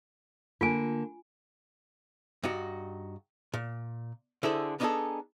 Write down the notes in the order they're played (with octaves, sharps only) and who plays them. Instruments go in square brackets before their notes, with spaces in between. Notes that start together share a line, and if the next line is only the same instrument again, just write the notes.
[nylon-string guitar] D3 A#3 [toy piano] F4 G#5
[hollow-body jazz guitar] G2 D#4 F#4
A#2
D3 E4 G#4 A4 C5
B3 D4 D#4 F4 G#4 A4